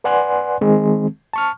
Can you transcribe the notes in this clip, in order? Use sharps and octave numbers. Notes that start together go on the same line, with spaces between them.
B4 D5 F#5 G#5 C6 F#6
D#3 G#3 C4
A5 C#6 F6